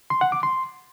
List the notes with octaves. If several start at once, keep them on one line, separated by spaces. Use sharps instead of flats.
C6
F#5
D6
C6